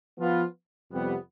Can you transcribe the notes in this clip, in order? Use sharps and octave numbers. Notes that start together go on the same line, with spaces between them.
F3 B3 F4
F2 C3 G3 B3